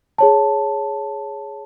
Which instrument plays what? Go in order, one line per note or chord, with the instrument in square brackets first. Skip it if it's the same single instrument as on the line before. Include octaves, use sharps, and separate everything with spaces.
[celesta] G#4 C#5 A5